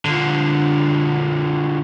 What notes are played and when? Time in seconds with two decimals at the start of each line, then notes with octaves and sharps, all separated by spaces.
0.05 D3 F3